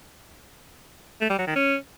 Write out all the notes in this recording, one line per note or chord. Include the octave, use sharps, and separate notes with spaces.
A3
G3
F#3
D#3
C#4